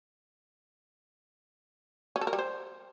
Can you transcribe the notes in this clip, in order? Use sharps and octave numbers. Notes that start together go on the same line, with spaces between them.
C#4
A4
A#4
G3
C5